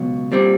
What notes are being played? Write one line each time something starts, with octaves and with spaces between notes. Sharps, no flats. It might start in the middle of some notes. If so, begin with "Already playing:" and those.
Already playing: C#2 B2 F#3
A#2 G3 C4